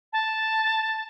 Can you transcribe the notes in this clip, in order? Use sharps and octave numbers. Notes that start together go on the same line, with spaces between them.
A5